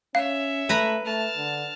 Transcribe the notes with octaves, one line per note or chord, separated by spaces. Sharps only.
C#4 C#5 E5 F5
A3 B4 A#5 B5
A3 A5 F6
D3